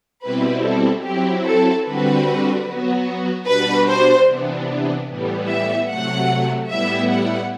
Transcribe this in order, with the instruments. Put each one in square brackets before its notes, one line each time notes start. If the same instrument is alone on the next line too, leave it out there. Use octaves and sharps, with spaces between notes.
[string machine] B2 G3 C4 E4 [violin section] B4
[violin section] A4
[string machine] F#3 C4 E4 [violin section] G4
[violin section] A4
[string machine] D3 G3 C4 F#4 [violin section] B4
[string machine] F#3 B3 F#4
[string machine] B2 G3 D4 F#4 [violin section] B4
[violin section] C5
[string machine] C3 E3 B3 D4
A2 E3 G3 B3
[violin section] E5
[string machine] C3 F#3 A3 [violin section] F#5
[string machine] A2 G3 B3 E4 [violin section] E5
[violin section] F#5